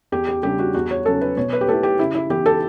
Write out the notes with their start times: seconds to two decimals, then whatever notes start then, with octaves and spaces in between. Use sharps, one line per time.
0.12 E2 G4
0.28 G4
0.43 C#3 G3 D4 G4
0.59 F#4
0.74 E2 F#4
0.91 C#5
1.06 C#3 F#3 C#4 A4
1.21 B4
1.37 B2 C#5
1.53 B4
1.61 G4
1.68 A3 E4 A4
1.83 G4
1.99 C#3 E4
2.15 E4
2.30 E3 B3 E4 G4
2.46 A4